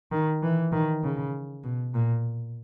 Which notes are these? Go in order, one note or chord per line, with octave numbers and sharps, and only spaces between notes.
D#3
E3
D#3
C#3
B2
A#2